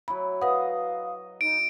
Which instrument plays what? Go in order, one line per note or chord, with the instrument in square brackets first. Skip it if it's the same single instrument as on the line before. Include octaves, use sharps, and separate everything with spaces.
[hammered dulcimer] F#3 E4 [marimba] B5
[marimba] B4 F#5 [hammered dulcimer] D#5 [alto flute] F5
[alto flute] D#4 [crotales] D7